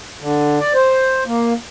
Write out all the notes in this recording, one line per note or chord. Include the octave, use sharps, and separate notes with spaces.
D3
D5
C5
A#3